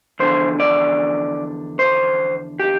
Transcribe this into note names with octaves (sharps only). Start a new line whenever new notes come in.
E2 D3 F3 C5
D5
C5
G4